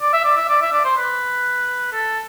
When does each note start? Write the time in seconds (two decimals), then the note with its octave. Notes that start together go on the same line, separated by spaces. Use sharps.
0.01 D5
0.13 E5
0.25 D5
0.37 E5
0.49 D5
0.62 E5
0.72 D5
0.85 C5
0.97 B4
1.93 A4